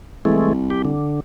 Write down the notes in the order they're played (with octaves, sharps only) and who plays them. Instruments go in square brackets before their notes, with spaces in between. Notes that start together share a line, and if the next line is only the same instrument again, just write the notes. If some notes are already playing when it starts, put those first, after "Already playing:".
[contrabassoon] C2 [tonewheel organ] E3 G#3 A3
[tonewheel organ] G4
D3